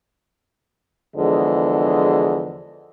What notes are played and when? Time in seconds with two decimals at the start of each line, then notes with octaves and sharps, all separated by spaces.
1.17 E2 D3 F3 G#3